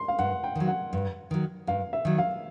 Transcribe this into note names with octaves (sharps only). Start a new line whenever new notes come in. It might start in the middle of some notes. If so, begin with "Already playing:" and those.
Already playing: C6
F5
G2 F#5
G5
D#3 F#3
F#5
G2
D#3 F#3
G2 F5
E5
D#3 F#3
F5